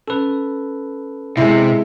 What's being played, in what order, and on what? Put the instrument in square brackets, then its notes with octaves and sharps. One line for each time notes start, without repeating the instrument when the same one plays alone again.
[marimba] C#4 [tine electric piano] A4 B4
[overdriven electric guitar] C3 [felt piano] G#3 E4